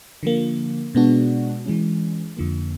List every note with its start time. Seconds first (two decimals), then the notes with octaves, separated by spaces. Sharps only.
0.23 D3 F3 A#3
0.95 B2 G#3 B3 D4 F#4
1.66 E3 G#3 C#4
2.37 F2 D3 F3 A#3